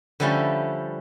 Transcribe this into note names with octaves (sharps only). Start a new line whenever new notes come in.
D3 F3 G3 A3 C#4 E4